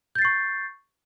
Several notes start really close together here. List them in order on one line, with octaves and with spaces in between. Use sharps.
G6 A6 C7 C#6